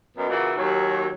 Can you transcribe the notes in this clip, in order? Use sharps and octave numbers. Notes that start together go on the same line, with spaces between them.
F#2 B2
A#2 C#3 E3 F#4
D#2 F#3